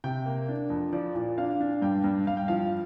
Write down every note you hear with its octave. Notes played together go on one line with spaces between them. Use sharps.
C3 G5
A#3
D4
F2
F3 D5
A#2
D4 F5
D4
G2 G5
G2
G2 F5
G5
F3 F5